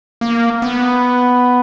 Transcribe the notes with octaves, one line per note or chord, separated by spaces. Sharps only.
A#3
B3